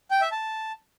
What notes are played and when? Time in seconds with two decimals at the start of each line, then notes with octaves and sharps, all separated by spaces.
0.11 G5
0.21 E5
0.32 A5